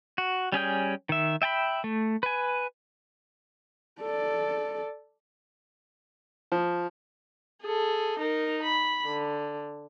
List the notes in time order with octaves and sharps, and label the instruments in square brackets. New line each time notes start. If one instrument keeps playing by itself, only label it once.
[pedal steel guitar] F#4
G3 C#4 G#4 G5
D#3 E5
E5 G5 A5 B5
A3
B4 G#5
[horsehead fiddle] A4 D5
[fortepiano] F3
[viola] G#4 A4
D#4 A#4
B5
D3